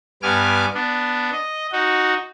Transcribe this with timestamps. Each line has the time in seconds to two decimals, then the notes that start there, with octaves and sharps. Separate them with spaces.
0.23 G2 B3 G#5 D6 F6
0.74 B3 D4
1.32 D#5
1.72 D#4 F#4